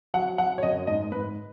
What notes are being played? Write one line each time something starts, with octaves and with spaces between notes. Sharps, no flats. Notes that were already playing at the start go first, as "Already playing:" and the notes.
F#3 F#5
F#3 F#5
C#5
F#2 D#5
G#2 D#5
G#2 B4